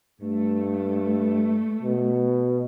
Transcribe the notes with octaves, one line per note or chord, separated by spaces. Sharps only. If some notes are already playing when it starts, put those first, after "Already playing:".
G2 A3
B2